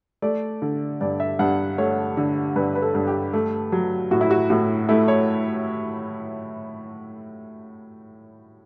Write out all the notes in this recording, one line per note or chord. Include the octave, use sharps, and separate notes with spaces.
A3 D5
D3
G2 D5
E5
G2 F#5
A3 C#5
D3
G2 B4
B4
A4
G2
G4
A3
F#3
A2 F#4
E4
F#4
A2 F#4
A3 E4
C#5